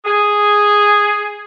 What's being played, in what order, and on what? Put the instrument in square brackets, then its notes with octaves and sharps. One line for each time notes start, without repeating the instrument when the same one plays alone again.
[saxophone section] G#4